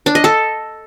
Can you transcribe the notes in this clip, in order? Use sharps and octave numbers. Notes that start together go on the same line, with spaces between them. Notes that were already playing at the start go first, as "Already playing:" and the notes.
D4
D#5
A4